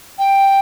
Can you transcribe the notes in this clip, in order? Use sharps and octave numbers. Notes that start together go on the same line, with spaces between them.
G5